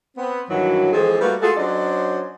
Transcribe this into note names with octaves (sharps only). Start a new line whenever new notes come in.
B3 C4
G2 D#3 E3 F#3
E3 F3 G#3 C4 G#4 A4
G3 A3 A#3 F#4 B4
G#3 F4 F#4 G#4 A4
F#3 C#4 D4 C5 D5 D#5